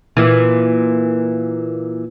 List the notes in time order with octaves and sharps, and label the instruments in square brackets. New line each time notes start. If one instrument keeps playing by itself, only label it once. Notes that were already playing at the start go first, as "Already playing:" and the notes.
[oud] A#2 E3